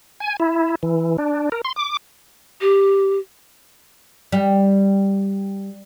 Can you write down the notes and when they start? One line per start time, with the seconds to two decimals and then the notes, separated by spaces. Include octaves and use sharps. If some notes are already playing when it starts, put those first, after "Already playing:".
0.20 G#5
0.40 E4
0.83 E3
1.18 D4
1.52 A#4
1.65 C6
1.76 D6
2.61 G4
4.32 G3